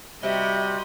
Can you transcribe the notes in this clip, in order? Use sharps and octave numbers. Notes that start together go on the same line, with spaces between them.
C3 G3 F#4 D#5 E5 B5